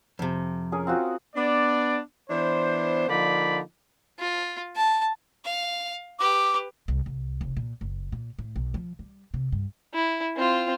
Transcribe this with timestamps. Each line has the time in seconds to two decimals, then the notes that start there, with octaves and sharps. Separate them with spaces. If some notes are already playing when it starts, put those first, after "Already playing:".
0.19 F2 C3
0.72 C#4 G#4 A#4
0.87 C4 F4 F#4
1.35 B3 D4 D5
2.30 E3 B3 D4 C5
3.08 D3 F3 A#3 D#4 D5 B5
4.19 F4
4.76 A5
5.45 F5
6.19 G4 B4 D6
6.88 C2
7.06 C2
7.41 F1
7.57 A#2
7.81 F#1
8.12 A#2
8.39 A2
8.56 B1
8.74 F3
8.99 G3
9.34 C3
9.52 G2
9.94 E4
10.36 C4 F4